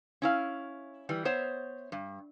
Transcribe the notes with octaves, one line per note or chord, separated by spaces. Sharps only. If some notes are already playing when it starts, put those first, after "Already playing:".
C#4 E4 F5
E3 G3
B3 C5 C#5 E5
G2